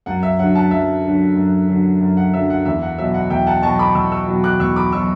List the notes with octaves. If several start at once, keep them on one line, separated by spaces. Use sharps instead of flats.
F#2 F#5
E5
D3 F#3 F#5
F#5 A5
F#2 E5
D3 F#3
F#2
D3 F#3
F#2
F#5
D3 F#3 E5
F#5
E2 E5
F#5
B2 F#3 E5
F#5
E2 E5 G5
F#5 A5
B2 F#3 A5 C#6
B5 D6
E2 C#6 E6
C#6 E6
B2 F#3
D6 F#6
E2 C#6 E6
B5 D6
B2 F#3 C#6 E6